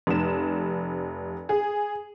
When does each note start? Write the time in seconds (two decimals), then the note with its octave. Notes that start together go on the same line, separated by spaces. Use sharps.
0.07 F1 E7
1.49 G#4